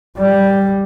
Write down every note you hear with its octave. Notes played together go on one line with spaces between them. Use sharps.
G3